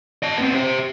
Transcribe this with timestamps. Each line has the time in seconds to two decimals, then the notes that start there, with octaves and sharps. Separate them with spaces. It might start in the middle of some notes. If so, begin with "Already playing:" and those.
0.23 D#5 A5
0.38 B3 C4
0.54 G4 C5